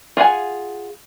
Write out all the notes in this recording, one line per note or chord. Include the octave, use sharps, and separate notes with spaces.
F4 G#4 F#5 G#5